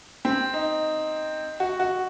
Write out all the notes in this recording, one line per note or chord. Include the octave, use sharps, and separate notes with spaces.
C4
D#4
F#4
F#4